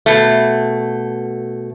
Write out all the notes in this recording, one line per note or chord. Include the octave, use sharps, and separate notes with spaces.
B2 A3